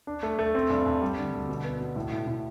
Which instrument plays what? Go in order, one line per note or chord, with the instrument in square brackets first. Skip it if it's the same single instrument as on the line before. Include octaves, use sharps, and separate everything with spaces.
[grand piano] D4
A3
A3
C4
G2
G2
G3
D3
D2
B2
B3
B2
A2
A2
A2